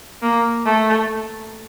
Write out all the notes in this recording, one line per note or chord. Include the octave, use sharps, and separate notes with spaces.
A#3
A3